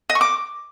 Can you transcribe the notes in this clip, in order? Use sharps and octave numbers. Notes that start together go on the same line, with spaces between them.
D#5
C#6
D6